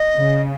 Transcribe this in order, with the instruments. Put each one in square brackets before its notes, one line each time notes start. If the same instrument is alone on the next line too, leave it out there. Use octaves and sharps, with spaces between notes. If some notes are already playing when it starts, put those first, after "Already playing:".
Already playing: [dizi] D#5
[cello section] C#3